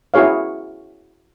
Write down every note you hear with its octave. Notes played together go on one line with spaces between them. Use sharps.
E4 F#4 G#4 C#5 F5